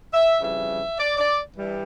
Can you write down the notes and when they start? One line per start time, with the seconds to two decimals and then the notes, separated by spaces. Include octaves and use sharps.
0.12 E5
0.41 F2 C#3 E3 G3 E5
0.98 D5
1.17 D5
1.55 G2 E3 G3